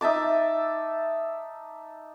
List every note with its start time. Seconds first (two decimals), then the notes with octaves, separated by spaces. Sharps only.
0.01 D#4 E5 A5 D6